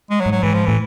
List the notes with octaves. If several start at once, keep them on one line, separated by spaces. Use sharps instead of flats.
G#3
F#3
G#2
F#3
G#2 E3
F3
A2 E3